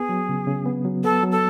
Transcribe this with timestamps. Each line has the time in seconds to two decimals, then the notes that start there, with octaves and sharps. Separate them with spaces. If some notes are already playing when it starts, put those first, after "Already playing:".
Already playing: B3 G#4
0.09 F#3
0.29 C#3
0.47 C#3
0.66 B3
0.85 F#3
1.04 B3 A4
1.23 F#3
1.32 A4